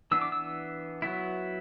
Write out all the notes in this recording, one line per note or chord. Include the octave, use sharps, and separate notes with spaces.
E3 B3 D4 E6
D6
E6
F#3 B3 E4